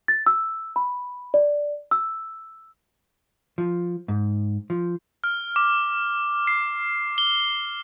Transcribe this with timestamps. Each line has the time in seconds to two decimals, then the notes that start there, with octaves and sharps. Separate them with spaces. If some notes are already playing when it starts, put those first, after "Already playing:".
0.08 A6
0.26 E6
0.76 B5
1.34 D5
1.91 E6
3.58 F3
4.08 G#2
4.70 F3
5.24 F6
5.56 D6
6.47 C7
7.18 G7